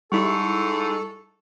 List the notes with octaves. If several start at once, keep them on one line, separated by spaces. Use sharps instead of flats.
G#2 G3 E4 A4 C#6